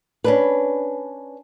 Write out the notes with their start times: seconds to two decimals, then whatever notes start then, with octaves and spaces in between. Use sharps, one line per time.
0.24 C#4 D4 B4